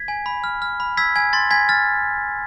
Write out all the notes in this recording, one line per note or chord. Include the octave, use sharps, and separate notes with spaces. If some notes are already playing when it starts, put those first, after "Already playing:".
Already playing: G#6 B6
G#5
B5
F6
F6
B5
E6 G#6 B6
G#5 G#6
C6 A6
G#5 G#6 B6
F6 A6